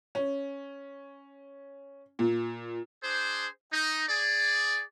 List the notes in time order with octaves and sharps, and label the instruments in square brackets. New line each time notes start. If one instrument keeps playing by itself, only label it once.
[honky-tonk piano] C#4
A#2
[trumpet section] D4 G#4 C5
D#4
G#4 D5